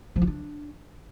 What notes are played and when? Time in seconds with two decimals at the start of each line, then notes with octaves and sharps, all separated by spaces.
0.16 F3
0.21 F4
0.27 D4